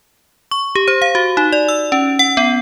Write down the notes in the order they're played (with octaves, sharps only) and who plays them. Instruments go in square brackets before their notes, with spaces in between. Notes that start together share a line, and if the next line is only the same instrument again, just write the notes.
[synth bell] C#6
G4
C5
F5
F#4
D#4
D5
E6
C#4
F#5
B3